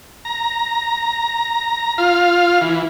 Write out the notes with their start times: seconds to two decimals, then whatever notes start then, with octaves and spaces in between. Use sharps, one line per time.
0.25 A#5
1.98 F4 F5
2.61 E3